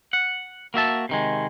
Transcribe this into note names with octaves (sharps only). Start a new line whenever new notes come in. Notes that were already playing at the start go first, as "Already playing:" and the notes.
F#5
A#3 F#4 E5 A5
C3 D#3 G#3